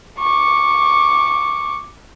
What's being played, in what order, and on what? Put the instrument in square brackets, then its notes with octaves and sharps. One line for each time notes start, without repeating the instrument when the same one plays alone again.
[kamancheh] C#6 D6